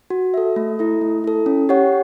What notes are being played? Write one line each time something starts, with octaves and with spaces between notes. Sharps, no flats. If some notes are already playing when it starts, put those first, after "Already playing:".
F#4
A4 E5
A3
E4 A4
A3
E4 A4
C#4
G4 C#5 F#5